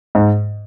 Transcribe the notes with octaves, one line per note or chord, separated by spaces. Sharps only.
G#2